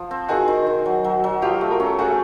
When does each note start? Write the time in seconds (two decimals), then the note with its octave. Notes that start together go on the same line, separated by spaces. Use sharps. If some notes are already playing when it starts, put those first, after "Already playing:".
Already playing: F3
0.11 C4
0.29 D#3 F#4 G#4
0.48 D#3
0.67 D#3
0.86 F#3
1.04 F#3
1.24 F#3
1.42 F3 F4 G4
1.61 A3
1.71 A#4
1.80 C#4 A4
1.99 A3 F#4 G#4